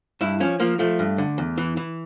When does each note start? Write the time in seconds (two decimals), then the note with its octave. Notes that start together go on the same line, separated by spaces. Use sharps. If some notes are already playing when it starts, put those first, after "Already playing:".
0.21 G2 E4
0.40 F3 C#4
0.60 F3 A#3
0.79 F3 A3
0.99 G2
1.18 D3
1.38 E2
1.58 E3
1.77 E3